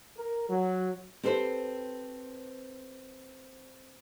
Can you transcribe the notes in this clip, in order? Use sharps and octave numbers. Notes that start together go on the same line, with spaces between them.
A#4
F#3
C4 G4 A4 B4 C5